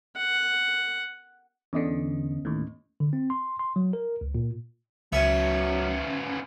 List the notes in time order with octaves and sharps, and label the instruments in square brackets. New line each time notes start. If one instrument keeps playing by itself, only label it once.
[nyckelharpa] F#5
[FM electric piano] E2 D3 [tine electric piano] B3 C#4 D#5
[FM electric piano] D#2 A2
[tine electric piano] D3
C4
C6
C6
F#3
A#4
C#2
A#2
[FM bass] C#2 [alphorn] F#3 [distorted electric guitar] B3 C#4 [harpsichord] E5